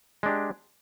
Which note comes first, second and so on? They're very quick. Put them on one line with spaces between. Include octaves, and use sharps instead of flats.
G#3 D4 G4